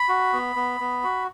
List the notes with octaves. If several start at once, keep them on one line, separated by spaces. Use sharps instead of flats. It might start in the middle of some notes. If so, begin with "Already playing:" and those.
Already playing: B5
F#4
B3
B3
B3
F#4